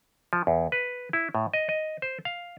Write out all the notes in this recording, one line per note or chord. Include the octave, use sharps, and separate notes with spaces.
F3
E2
B4
E4
A2
D#5
D#5
C5
F5